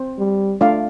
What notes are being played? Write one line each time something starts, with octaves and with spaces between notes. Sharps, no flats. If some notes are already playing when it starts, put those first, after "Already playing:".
Already playing: C4 C5
G3
A3 D4 F4 D5 F5